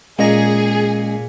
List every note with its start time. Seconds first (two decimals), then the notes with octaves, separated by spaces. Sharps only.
0.19 A#2 G#3 C#4 G#4 D#5 A#5